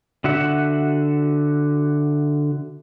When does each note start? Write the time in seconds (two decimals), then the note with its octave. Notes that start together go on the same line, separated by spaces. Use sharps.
0.24 D3 F#4 E5 F#5